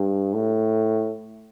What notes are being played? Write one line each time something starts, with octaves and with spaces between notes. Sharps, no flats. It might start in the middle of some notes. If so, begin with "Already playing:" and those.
Already playing: G2
A2